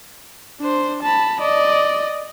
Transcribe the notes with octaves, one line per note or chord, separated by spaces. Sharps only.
D4 C5
A5 B5
D5 D#5